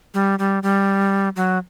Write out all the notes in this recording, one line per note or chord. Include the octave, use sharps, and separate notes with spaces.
G3
G3
G3
F#3